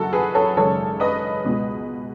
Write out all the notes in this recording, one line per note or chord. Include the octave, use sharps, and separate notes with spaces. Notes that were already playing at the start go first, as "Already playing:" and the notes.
Already playing: F#1 F#2 C#3 F#4 A4
G#4 B4
A4 C#5
G#1 F#2 C#3 A4 C#5
B4 D#5
C#2 B2 G#3